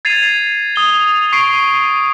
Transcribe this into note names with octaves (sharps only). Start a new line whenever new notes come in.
G#6 A6 C7 D#7 F7
D#6 G7
C#6 C7 D7